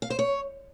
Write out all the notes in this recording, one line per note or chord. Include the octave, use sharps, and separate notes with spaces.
F5
C5
C#5